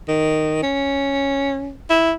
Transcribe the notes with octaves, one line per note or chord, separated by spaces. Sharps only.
D#3
C#4
E4